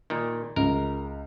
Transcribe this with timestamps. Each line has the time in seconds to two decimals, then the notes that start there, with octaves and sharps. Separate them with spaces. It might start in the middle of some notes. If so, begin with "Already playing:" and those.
0.10 A#2 D#3
0.56 C#2 A#4